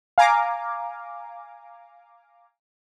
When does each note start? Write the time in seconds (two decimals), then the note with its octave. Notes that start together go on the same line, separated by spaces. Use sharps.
0.18 F5 G#5 A#5 D6